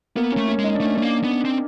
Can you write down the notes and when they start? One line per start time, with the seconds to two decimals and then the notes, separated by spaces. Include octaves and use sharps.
0.16 A#3 B3
0.32 C#4
0.37 A3
0.48 C#4
0.59 G#3
0.64 D#4
0.74 D4
0.81 A3 C#4
0.96 A3 D4
1.02 A#3
1.24 B3
1.45 C4